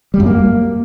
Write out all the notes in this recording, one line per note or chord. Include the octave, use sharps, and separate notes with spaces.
G3
F#2
A#3